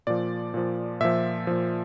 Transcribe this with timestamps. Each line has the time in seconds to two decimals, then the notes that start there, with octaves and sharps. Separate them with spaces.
0.07 A#2 F3 D5
0.54 A#2 F3
1.00 A#2 F3 E5
1.47 A#2 F3